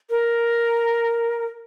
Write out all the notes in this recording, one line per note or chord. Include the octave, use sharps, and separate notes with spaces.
A#4